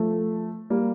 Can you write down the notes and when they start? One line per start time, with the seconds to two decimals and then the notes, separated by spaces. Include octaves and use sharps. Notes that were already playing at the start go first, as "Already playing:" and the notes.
Already playing: F3 A3
0.70 G3 A#3